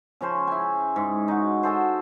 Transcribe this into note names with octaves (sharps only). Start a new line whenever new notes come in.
C#3 F3 C#4 C5
E4 G#5
G#2
D#4 F#4
F#4 G#4 A4 C5